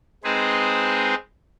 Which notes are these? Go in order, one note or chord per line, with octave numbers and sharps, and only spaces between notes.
G#3 C4 D#4 G#4 B4 C5